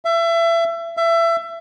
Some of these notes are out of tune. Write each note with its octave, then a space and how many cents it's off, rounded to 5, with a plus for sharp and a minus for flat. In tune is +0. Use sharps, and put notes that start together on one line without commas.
E5 +30
E5 +25